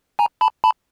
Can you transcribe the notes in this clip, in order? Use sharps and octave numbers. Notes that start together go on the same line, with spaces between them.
G#5 A#5
A5 B5
A5 B5